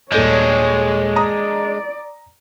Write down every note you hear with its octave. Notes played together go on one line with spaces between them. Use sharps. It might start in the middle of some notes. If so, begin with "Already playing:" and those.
D#1 G#3 D4 A4 C#5 G6
D5 A#5 D#6